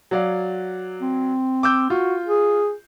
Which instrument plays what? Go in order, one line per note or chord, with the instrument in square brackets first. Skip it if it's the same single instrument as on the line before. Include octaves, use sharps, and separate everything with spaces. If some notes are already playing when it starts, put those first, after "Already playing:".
[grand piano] F#3 D5 F5
[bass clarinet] C4
[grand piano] D6 E6 G6
[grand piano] F4 [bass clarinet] F#4
[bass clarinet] G#4